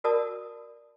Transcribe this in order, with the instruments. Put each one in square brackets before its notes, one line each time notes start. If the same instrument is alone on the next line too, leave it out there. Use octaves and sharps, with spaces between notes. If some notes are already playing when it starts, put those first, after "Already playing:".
[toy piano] F#4 A#4 D5 A5 D#6